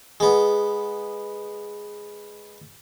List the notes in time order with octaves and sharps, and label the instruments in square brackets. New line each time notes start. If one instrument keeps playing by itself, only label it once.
[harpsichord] G#3 B3